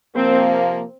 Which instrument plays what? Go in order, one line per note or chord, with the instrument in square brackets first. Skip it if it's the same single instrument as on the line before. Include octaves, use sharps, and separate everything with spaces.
[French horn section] C3 F3 A#3 [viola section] C4